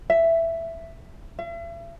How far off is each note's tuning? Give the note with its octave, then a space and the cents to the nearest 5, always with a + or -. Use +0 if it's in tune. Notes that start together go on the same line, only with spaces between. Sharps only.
E5 +5
E5 +40